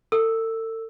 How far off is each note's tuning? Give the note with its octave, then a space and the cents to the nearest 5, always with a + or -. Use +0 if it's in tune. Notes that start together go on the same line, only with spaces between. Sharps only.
A4 +40 E6 +0